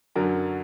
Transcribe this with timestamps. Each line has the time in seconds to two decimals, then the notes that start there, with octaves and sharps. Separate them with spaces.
0.15 F#2 D3 F#3 A#4